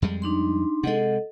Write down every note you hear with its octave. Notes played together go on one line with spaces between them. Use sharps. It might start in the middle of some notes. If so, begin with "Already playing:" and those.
F2 G3 G#3
D4 D#4 C6
C3 G#3 A4 D#5 F#5